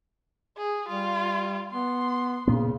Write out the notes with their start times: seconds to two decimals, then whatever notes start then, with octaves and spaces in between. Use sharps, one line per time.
0.57 G#4
0.89 G3 F4
1.72 B3 C6
2.48 A#2 C#3 B3